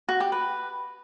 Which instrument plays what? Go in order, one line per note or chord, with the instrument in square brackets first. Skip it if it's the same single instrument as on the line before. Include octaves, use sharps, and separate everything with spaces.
[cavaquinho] F#4
G4
B4